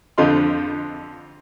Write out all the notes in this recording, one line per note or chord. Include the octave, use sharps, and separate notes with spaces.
F2 D3 C4 F4 D#5 C6